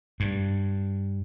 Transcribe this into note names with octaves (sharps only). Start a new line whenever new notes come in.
G2